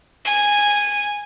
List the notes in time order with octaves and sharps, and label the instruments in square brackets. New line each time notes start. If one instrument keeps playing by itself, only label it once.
[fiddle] G#5